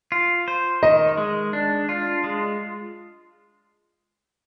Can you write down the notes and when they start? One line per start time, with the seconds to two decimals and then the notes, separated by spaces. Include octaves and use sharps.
0.12 F4
0.48 C5
0.83 D#3 D#5
1.17 G#3
1.53 D4
1.89 F4
2.24 G#3